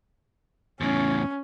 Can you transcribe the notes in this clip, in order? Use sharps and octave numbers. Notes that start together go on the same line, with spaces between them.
E2 A2 C#4